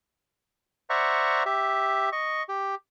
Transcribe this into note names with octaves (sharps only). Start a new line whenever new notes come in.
C5 D5 E5 F#5 A#5 C#6
G4 E5
D#5 C#6
G4